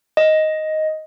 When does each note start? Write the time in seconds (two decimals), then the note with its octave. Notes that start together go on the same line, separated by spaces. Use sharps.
0.17 D#5